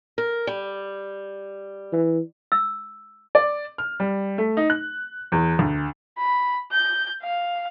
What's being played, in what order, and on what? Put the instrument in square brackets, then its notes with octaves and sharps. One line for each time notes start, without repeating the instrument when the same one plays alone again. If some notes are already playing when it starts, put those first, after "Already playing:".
[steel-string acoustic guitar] A#4
G3
[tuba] E3
[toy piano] E6
[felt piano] D5
F6
G3
A3
D#4
F#6
E2
D2
[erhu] B5
G6
F5